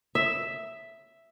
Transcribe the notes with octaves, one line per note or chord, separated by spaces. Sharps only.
E5